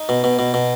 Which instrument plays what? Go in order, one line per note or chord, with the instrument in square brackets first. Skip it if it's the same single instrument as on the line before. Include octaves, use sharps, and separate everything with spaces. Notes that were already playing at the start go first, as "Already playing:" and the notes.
Already playing: [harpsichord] D#4
B2
B2
B2
B2